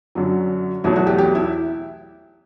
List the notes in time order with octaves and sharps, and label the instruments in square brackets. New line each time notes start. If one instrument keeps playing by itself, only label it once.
[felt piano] F#2 D3 F#3
E2 B2 F#3 A3 E4
F#4
G4
G4
E4